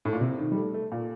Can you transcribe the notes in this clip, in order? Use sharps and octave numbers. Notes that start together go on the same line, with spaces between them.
A2
A#2
C3
D#3
G3
A3
A3
A#2